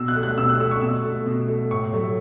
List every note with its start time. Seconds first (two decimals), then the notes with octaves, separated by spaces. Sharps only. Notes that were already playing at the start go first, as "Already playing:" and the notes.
Already playing: B2 E6
0.08 F#6
0.16 A3
0.23 F#6
0.38 B2 E6
0.49 F#6
0.60 A3 E6
0.71 C#6
0.82 B2 E6
1.05 A3
1.26 B2
1.48 A3
1.71 A2 C#6
1.93 F#3 A3